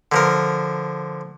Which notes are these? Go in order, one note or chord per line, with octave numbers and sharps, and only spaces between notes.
D3 F3 A#4